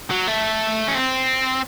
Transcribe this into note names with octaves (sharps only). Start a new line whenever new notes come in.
F#3
A3
C#4
C4